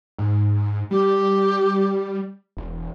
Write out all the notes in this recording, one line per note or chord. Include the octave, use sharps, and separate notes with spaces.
G#2
G3 G4
E1